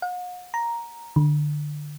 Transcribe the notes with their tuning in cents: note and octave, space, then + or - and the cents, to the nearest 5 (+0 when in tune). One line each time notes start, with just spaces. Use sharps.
F#5 -45
A#5 +5
D3 +15